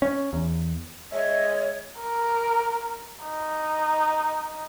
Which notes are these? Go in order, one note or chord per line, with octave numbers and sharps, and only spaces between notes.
C#4
E2
G#3 C#5 D#5 E5
A#4
D#4